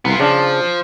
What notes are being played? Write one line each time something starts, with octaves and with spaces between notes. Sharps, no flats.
C2 B3 F4
C#3 F3 D4